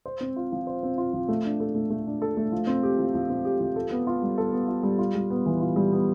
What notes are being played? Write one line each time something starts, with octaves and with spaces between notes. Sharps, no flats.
C5
C4
F4
F3
C5
C4
F4
F3
A3
D4
A4
A3
A3
D4
A4
A3
F3
C4
G4
F3
F3
C4
G4
F3
A4
B3
F4
G3
A4
B3
F4
G3
F4
G3
B3
E3
F4
G3
B3